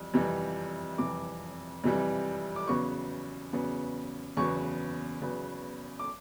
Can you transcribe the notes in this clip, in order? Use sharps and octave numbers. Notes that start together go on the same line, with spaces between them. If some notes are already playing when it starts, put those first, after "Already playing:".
Already playing: F2 E3 G3
F2 C3 E3 G3
F2 C3 E3 G3 D6
F2 C3 E3 G3
D6
E2 C#3 F#3 B3 C#6
E2 C#3 F#3 B3
E2 C#3 F#3 B3 C#6
E2 C#3 F#3 B3
D6